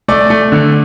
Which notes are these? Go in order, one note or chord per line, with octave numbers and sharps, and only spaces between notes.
A3 D5
A3
D3